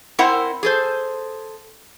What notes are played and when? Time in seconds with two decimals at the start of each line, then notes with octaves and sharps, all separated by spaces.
0.19 C4 E4 A#4 C5 E5 F#5
0.63 G#4 A4 C5